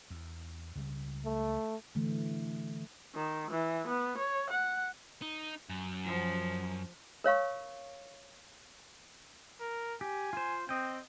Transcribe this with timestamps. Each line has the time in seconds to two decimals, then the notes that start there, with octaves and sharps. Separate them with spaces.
0.10 E2
0.75 C#2 C#3 G3
1.25 A3
1.95 D3 E3 A3
3.15 D#3
3.51 E3
3.88 B3
4.18 C#5
4.50 F#5
5.22 D#4
5.69 F#2
6.05 F3
7.24 A#4 C#5 F5 C#6
9.60 A#4
10.01 G4 G#5
10.33 F4 C5
10.69 C4 D#5 G5